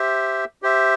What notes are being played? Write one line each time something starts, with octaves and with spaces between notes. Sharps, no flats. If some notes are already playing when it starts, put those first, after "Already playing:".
Already playing: G4 C5 E5
G4 C5 E5